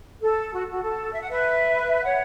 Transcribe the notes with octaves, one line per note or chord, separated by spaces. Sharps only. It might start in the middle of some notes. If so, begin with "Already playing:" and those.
A4
F#4
F#4
A4
E5
F#5
B4 E5
C#5 F#5